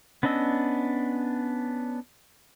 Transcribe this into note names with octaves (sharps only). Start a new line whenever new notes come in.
B3 C#4 D4 D#5 E6